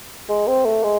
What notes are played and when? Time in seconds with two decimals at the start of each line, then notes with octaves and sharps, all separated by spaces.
0.29 G#3
0.47 C4
0.65 A3
0.83 G#3